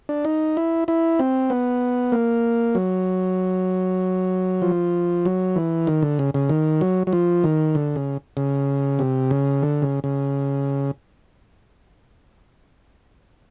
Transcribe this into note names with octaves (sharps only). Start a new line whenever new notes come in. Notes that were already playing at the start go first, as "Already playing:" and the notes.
D4
D#4
E4
E4
C4
B3
A#3
F#3
F3
F#3
E3
D#3
D3
C#3
C#3
D#3
F#3
F#3
F3
D#3
D3
C#3
C#3
C3
C#3
D3
C#3
C#3